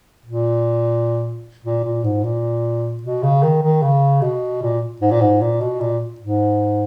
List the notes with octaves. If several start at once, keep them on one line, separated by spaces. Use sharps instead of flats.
A#2
A#2
A#2
G#2
A#2
B2
C#3
D#3
D#3
C#3
B2
A#2
G#2
A#2
G#2
A#2
B2
A#2
G#2